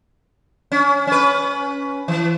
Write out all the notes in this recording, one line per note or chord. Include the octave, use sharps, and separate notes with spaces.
C#4
C#4 B4
E3